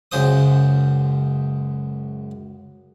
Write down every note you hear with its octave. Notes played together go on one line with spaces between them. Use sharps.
C#2 F#2 C#3 C5 D#6